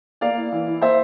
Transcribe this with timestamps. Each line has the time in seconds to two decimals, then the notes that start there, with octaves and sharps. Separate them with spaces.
0.21 A#3 D5 F5
0.37 E4
0.52 E3
0.67 E4
0.81 A#3 C5 E5